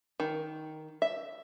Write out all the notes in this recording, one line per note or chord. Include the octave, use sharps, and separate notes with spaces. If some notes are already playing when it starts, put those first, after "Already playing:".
D#3
E5